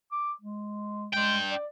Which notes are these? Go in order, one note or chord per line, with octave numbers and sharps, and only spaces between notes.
D6
G#3
G#3 D4 G5
D5